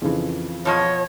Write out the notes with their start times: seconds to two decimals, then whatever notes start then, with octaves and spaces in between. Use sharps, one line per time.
0.02 F2 C#3 E3
0.65 B2 F3 C#5 D#5